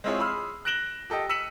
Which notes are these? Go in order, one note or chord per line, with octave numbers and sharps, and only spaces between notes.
G#3 C4 E4 F4 G#4 C#5
G#4 B5 C6 E6 F6
F#6 A#6 D7 E7 F#7 G7
G4 A4 D#5 G5
E6 B6 C#7 D#7 E7 F#7